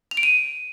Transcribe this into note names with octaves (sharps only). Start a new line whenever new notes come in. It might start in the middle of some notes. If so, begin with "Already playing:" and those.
F7
D7
D#7